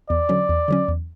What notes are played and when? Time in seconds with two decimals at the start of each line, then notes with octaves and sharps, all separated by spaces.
0.10 E2 D5
0.29 D3 F#3 C#4
0.49 E2
0.68 D3 F#3 C#4
0.88 E2